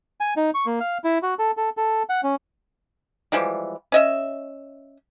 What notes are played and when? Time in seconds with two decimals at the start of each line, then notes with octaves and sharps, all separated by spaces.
0.20 G#5
0.37 D#4
0.54 C#6
0.66 A#3
0.80 F5
1.04 E4
1.23 F#4
1.39 A4
1.57 A4
1.77 A4
2.09 F#5
2.23 C#4
3.32 E3 F3 G3 G#3
3.92 C#4 D#5 E5